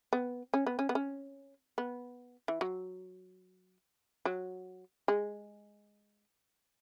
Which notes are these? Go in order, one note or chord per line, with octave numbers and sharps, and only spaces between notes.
B3
C#4
B3
C#4
B3
C#4
B3
E3
F#3
F#3
G#3